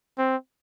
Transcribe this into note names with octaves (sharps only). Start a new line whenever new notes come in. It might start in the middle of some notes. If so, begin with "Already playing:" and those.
C4